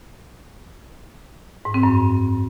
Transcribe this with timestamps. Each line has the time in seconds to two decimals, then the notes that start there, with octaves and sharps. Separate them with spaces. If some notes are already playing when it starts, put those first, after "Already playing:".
1.65 G#2
1.74 C4
1.83 F#2